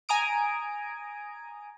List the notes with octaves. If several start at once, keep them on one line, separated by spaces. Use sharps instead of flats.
G#5 A#5 D#6 D7